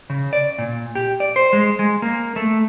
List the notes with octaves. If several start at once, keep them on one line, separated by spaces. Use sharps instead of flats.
C#3
D5
A#2
G4
D5
C5
G#3
G#3
A#3
A3